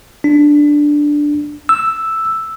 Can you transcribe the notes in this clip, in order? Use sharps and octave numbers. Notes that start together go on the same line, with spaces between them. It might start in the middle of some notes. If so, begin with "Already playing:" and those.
D4
E6